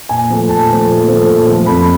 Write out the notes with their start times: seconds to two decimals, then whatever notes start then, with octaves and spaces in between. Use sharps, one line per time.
0.09 A#2 G#5
0.30 F3 A3
0.49 A#2 A5
0.68 F3 A3
0.89 A#2
1.08 F3 A3
1.28 A#2
1.47 F3 A3
1.66 F2 B5